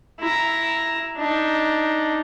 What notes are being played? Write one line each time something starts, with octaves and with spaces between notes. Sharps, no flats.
E4 A#5
D4 D#4